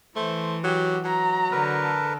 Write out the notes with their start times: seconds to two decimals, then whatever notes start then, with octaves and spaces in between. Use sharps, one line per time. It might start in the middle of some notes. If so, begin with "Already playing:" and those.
0.16 E3 A3 C5
0.64 F#3 G4
1.05 F#3 A#5
1.52 D3 A#4 B4
1.82 A4